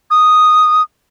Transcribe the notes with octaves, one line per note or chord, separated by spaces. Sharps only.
D#6